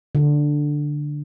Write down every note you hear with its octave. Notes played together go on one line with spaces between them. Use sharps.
D3